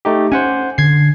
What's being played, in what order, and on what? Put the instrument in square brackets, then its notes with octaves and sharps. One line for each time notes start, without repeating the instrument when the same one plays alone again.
[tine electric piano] A3 D#4 G4
[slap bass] C#4 [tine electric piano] C5 F#5 G#5
[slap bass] D3 [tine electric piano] G#6 C7